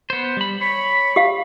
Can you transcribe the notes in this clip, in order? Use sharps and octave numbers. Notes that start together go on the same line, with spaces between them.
B3 C5
G3 B5
C#5 B5
G4 F5